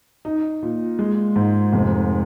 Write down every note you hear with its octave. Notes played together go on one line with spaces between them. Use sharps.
D#4
A#2
G#3
G#2
F1